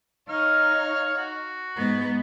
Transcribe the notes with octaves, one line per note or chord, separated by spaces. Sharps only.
D#4 C#5 F5 F6
F#4
G#2 B3